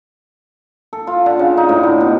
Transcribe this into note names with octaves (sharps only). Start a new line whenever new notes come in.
A4
F4
D3
C#3
D#4
A2
D3
B2